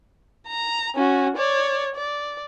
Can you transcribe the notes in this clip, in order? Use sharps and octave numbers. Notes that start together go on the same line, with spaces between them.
A#5
C#4 F#4
C#5 D5
D5